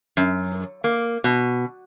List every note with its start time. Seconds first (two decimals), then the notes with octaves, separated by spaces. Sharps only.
0.17 F#2
0.84 A#3
1.24 B2